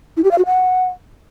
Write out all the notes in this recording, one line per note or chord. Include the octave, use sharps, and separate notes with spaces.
E4
G4
F5
F#4
F#5